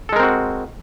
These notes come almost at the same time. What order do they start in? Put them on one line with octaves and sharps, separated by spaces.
A4 G#3 A#4 C4 F#4